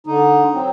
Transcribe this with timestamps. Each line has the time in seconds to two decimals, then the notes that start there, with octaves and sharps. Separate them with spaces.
0.07 D3 D#4
0.52 F#3 C4